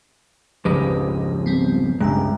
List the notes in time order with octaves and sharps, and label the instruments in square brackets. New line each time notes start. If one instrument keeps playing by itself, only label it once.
[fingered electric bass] F1 C#2 G#2 [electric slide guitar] F3 G4 D#5 [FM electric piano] B4
[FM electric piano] G3 B3 C4
[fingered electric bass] G1 C#2 G2 [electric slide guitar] G#3 [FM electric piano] E5 G5 A#5